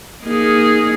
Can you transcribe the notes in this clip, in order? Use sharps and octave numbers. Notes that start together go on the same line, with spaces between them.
A#3 D#4 G#4